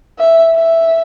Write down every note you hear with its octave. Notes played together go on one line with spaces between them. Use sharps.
E5
E5